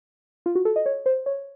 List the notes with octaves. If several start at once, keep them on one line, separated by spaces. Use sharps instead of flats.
F4
F#4
A4
D#5
C#5
C5
C#5